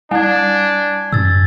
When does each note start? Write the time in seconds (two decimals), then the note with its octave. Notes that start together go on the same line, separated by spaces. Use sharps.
0.11 G3 D4 G#5 G#6
1.13 F#2 E6 A6